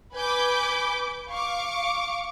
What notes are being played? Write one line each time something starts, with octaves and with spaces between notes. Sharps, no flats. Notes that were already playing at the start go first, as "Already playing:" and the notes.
B4 G#5 B5 D6 G6
F5 C#6 D6